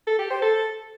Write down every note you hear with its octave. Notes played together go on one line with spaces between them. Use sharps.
A4
G4
C5
A4